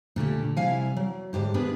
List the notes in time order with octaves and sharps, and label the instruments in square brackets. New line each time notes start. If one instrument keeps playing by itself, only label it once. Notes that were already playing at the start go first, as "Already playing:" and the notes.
[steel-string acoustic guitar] A#2 D3 A3 G4
C3 G3 E4 F5 G#5
F#3
D2 G#2 G4 C5
A#2 B3 D4 G#4 B4